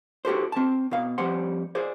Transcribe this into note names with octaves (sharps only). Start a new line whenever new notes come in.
F#4 G4 A4 C5
C4 A5
B2 F5
F2 G3 C5 F#5 C6
G#4 C5 D5